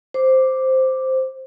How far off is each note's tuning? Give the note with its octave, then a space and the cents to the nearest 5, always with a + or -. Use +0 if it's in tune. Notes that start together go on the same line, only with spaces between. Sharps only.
C5 +0 D6 +0